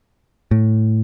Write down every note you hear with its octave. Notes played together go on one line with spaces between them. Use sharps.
A2